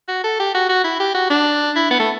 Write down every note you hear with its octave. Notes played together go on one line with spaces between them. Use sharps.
F#4
A4
G4
F#4
F#4
E4
G4
F#4
D4
E4
B3
A3